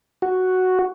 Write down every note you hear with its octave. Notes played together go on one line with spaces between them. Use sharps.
F#4